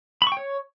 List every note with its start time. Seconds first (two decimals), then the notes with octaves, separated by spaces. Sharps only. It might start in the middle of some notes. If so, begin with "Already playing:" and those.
0.22 B5
0.27 C#6
0.32 G5
0.37 C#5